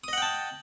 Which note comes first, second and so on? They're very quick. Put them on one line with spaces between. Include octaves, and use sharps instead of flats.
D#6 D#5 F#5 G5 A5